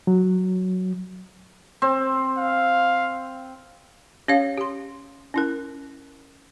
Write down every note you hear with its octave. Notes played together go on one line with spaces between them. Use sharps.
F#3
C4
F5
C#4 G4 C#5 F5
G4 C6
C#4 E4 A#4